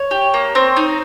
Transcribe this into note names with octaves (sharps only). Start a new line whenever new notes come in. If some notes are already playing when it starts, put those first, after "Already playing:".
Already playing: C#5
G4
A#3
C4
D#4